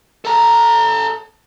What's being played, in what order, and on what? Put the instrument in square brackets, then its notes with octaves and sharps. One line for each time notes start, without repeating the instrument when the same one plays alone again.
[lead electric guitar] A4 A#5